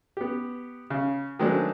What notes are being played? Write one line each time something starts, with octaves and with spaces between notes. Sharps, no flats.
B3 G4
C#3
D#3 F#3 G#3 A3 C4 D4